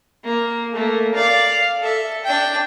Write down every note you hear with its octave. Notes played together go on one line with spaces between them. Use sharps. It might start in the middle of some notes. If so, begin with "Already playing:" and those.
A#3
A3 A#3
D5 F5
A4 E5
D4 G5